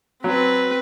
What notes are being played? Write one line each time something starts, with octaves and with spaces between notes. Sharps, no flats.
F#3 C4 B4